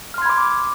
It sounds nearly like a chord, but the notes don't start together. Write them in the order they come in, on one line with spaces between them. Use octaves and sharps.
F6 C6 G#6 B5 D6